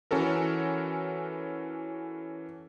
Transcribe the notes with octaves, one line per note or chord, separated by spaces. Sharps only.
E3 C#4 F#4 A4 A#4